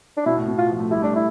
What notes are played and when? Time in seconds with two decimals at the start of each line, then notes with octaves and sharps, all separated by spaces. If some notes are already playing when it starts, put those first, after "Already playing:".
0.17 D4
0.26 B2 E4
0.37 A2
0.48 B2
0.58 F4
0.69 F3
0.80 A3
0.91 G3 E4
1.02 A3 D4
1.13 A3 E4